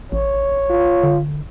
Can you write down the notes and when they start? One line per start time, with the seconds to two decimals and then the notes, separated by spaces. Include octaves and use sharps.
0.12 A1 C#5
0.70 F4
1.03 D3